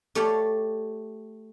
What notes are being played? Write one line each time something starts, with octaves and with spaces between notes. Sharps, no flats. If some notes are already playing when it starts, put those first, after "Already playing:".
A3 G4 C#5 D5 F5 G5